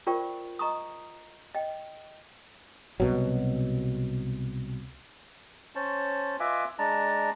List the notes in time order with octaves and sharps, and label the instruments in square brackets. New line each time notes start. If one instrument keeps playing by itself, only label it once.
[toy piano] F4 A#4 C5 D5 G5 C#6
D#5 A#5 C#6 D#6
D#5 G5
[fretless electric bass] C2 B2 F#3
[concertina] C#4 C5 C#5 A5
F4 B4 D#5 E5 G#5 D6
G#3 D4 A5 A#5